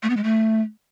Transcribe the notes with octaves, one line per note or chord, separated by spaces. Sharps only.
A3
B3
G#3
A3